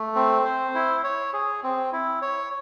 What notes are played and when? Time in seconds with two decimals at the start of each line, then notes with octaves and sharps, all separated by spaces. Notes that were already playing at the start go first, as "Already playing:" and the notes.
Already playing: A3
0.16 C4
0.45 C5
0.75 E4
1.04 C#5
1.34 G#4
1.64 C4
1.92 E4
2.22 C#5